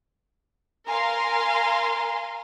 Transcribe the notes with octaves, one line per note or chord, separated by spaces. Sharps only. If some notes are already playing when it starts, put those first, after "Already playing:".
A#4 F5 G#5 A#5 C6